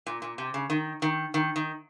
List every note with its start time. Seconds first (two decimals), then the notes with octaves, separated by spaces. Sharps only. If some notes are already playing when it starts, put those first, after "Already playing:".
0.07 A#2
0.22 A#2
0.38 C3
0.54 C#3
0.70 D#3
1.02 D#3
1.34 D#3
1.56 D#3